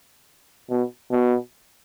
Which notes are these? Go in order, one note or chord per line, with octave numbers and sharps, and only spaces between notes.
B2
B2